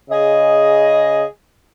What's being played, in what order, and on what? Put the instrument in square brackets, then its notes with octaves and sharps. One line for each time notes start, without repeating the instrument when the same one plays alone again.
[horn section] C#3 G#4 D#5